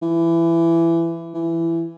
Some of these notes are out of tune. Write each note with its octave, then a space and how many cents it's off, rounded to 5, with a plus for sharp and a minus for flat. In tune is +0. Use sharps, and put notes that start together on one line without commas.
E3 +20
E3 +15